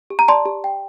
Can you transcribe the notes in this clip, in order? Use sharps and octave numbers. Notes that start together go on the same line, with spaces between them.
G4
A#5
D5 A5 C6
G4
G5